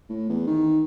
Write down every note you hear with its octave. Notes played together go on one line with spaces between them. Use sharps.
A2
E2
D#3